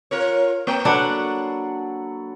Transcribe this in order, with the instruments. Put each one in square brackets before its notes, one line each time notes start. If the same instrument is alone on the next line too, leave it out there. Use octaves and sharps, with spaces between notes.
[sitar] F4 A#4 C#5
[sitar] A#3 [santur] C#5 G5 A#5
[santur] F#3 A4 B5 [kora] D4 F#5